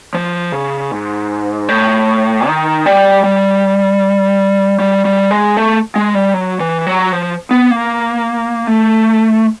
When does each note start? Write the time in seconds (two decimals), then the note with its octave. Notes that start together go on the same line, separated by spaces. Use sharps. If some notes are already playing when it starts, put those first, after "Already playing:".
0.14 F3
0.52 C#3
0.92 G#2
1.68 A2
2.47 D#3
2.86 G3
3.24 G3
4.79 G3
5.05 G3
5.31 G#3
5.57 A3
5.96 G#3
6.15 G3
6.34 F#3
6.60 E3
6.87 F#3
7.12 F3
7.51 B3
7.71 A#3
8.67 A3